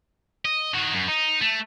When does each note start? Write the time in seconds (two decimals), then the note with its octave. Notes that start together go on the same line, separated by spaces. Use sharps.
0.45 D#5
0.74 D#3 F#4
0.94 F#2
1.08 D#4
1.41 A3